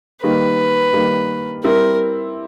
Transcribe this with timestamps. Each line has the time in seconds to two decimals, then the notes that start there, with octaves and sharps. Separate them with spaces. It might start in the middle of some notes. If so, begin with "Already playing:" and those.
0.22 D#3 G3 A#3 B4
0.93 D#3 G3 A#3
1.64 G3 C4 E4 A#4